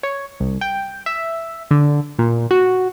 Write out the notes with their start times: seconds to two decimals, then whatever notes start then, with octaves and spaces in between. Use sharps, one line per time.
0.03 C#5
0.40 C2
0.61 G5
1.06 E5
1.71 D3
2.19 A#2
2.51 F#4